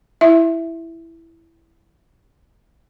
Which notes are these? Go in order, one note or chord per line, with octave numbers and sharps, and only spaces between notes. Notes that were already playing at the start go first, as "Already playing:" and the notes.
E4 E5